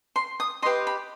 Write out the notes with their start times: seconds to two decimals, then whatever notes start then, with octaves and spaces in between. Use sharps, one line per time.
0.16 C6
0.40 D#6
0.62 D#5 C6
0.65 G4 B4
0.87 B5